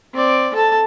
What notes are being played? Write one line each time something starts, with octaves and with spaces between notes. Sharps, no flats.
C4 D5
A4 A5